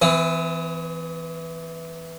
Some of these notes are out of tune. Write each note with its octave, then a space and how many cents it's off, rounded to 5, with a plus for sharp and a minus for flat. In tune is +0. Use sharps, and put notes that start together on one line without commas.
E3 +0 C4 -45